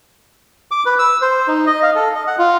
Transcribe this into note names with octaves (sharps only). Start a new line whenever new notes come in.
D6
B4
E6
C5
D#4
D#5
F5
A4
D#5
F#5
F4